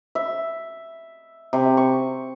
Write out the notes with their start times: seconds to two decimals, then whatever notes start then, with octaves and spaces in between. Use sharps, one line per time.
0.15 E5
1.53 C3
1.77 C#6